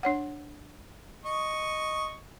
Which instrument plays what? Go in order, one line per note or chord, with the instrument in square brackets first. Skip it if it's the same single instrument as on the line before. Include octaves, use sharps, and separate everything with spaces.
[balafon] D4 C#5 F#5
[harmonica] D#5 C#6